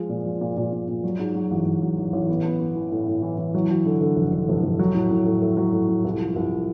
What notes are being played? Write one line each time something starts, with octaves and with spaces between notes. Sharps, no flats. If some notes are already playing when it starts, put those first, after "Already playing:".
Already playing: F3 G#3
A#2
F3
A#2
A#2
A#2
A#2
F#3
G#2
F#3
A1
A1
F#3
A1
A1
B3
B3
B3
E3
A2
A2
E3
E3
F#3
F#3
D3
D3
F1
D3
F1
F1
F#3
A2
A2
A2
A3
F#3
A2
A2
C2
F3
C2